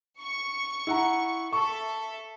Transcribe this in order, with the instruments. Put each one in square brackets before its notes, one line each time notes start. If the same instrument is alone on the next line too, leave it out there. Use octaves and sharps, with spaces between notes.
[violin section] C#6
[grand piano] E4 F#5 A#5
[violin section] A4 E5 [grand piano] C#6